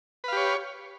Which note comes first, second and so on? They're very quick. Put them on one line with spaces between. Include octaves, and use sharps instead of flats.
B4 F5 G4 C#5